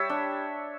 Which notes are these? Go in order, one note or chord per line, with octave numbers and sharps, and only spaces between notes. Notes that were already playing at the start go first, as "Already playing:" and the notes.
Already playing: G3 C#5 E5
D4